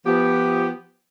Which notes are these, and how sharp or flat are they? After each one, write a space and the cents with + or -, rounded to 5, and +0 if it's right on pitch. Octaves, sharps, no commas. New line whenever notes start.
F3 -15 B3 +0 G4 +0